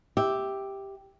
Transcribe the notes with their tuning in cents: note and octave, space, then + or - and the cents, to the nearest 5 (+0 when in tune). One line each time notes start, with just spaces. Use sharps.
G4 +0 E5 -10